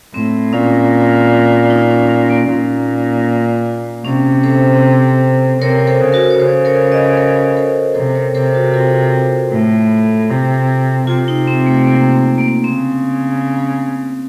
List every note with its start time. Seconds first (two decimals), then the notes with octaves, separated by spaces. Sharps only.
0.14 A2 C4
0.53 A#2 C#4
1.70 D#4
1.90 C#4
2.09 C#4
2.29 A#3
2.48 A#2
4.05 C3 C#4
4.43 A4 C5
5.61 C3 A#4 C#5
5.87 A4 C5
6.00 C#3
6.13 F#4 A#4
6.30 C#5
6.39 C#3 A4 C5
6.65 A#4 C#5
6.91 C5 D#5
7.17 A#4 C#5
7.57 A4 C5
7.95 C3 A4 C5
8.15 A#4 C#5
8.35 C3 A4 C5
8.54 F#4 A#4
8.74 F4 A4
9.52 A2
10.30 C3
11.07 C3 F4
11.28 D#4
11.47 C4
11.66 A3
11.86 A#3
12.38 A#3
12.64 C#3 C4